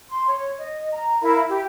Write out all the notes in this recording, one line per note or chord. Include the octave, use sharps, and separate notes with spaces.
C6
C#5
D#5
A#5
E4 A#4 F5 B5
G4